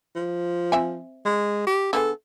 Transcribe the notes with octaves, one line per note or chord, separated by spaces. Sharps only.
F3
C4 E5 G#5
G#3
G4
D3 B3 G#4 A4